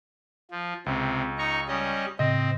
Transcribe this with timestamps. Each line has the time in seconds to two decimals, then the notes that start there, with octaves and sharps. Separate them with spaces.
0.51 F3
0.86 C#2 C3
1.38 D#4 A#5 C#6
1.68 G3 C#4 D#5
2.19 A2 C#3 C4 D#5 A#6